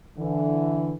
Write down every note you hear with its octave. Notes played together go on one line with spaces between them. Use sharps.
D3 E3